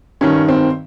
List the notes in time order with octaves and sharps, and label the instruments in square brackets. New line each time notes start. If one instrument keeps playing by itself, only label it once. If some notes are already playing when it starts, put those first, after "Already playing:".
[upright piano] G2 D#3 C#4
C4